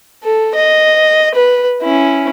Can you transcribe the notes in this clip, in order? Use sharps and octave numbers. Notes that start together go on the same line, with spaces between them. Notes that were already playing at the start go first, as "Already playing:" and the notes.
A4
D#5
B4
C#4 E4